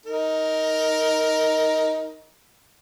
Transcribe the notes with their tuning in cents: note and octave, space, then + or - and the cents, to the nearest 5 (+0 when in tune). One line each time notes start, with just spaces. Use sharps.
D#4 +15 A#4 +0